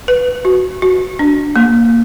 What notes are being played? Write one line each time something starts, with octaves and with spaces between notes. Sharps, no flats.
B4
F#4
F#4
D4
A#3